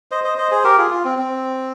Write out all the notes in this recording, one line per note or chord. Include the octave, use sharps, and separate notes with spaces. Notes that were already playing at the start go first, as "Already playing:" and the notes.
C5 D#5
C5 D#5
C5 D#5
G#4 C5
G4 A#4
F4 G#4
F4
C4
C4